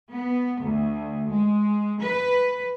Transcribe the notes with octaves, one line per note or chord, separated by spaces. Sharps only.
B3
D2
G#3
B4